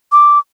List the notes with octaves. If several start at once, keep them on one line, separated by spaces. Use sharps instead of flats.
D6